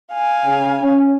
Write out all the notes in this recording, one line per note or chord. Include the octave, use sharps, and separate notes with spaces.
F5 G#5
C#3
C#4